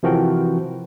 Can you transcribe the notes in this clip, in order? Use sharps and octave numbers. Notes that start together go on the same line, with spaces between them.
C3 E3 F3 F#4 A#4 G5